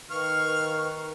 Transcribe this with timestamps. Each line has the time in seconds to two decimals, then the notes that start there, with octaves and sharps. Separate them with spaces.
0.11 D#3 B4 F5 C#6 F6